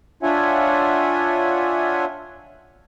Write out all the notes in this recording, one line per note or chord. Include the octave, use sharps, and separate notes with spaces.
D4 F4 C#5 E5 F#5 G#5